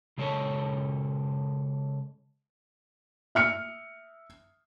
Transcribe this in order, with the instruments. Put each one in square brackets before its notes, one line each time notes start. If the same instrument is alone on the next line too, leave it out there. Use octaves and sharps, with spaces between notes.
[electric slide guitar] C#3 G#3 A4 A#4 C#5 A5
[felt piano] E5 F6 C#7